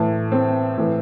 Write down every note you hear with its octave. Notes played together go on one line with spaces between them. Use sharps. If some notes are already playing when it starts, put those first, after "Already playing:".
Already playing: A2 E3
C4
A2 E3